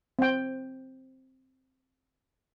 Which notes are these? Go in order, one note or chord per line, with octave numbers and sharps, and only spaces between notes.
C4 G5